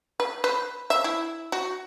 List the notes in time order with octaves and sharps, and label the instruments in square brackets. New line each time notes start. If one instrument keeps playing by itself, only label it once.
[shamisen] B4
B4
E5
E4
F#4